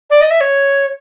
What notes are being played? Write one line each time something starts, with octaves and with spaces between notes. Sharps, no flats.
D5
D#5
E5
C#5